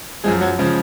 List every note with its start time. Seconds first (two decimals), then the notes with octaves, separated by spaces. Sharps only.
0.24 F#2 F3 G#3 G#4
0.41 F#3 F#4
0.59 C#3 F3 G#3